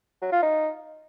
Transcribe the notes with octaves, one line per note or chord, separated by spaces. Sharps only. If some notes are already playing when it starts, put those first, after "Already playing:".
F#3
F4
D#4